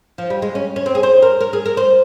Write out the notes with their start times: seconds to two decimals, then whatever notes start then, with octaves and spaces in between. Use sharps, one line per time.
0.18 F3
0.30 G3
0.42 G#3
0.55 C#4
0.76 C#4
0.86 C4
0.95 G#4
1.03 C5
1.22 A#4
1.41 A#4
1.53 G#4
1.66 A#4
1.77 C5